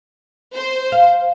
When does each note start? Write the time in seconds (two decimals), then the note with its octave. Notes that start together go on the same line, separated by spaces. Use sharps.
0.56 C5
0.92 F5